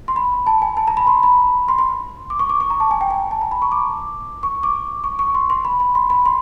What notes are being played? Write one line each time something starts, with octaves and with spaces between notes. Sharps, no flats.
C6
B5
A5
G#5
A5
A#5
B5
C6
B5
C6
C6
D6
C#6
D6
C#6
A#5
A5
G#5
G5
G#5
A5
A#5
B5
C#6
D6
C#6
D6
C#6
C#6
C6
C6
B5
B5
C6
B5
C6